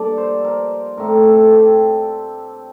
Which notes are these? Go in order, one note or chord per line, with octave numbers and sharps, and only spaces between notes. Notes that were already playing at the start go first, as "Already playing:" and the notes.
Already playing: G2 F3 A#3 D4 G4 A4 D5
C5
A#4
A2 A3 C4 A#4
A4
G4